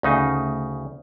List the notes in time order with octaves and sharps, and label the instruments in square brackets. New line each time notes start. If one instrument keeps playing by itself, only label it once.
[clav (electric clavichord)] D2 C#3 D#4